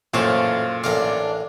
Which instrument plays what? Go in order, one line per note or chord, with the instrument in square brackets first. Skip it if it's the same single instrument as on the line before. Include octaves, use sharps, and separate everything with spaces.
[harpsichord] A1 A4 [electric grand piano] F#2 A#2 [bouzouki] C5 C#5 F5
[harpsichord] A1 A#4 F5 [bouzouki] D4 D5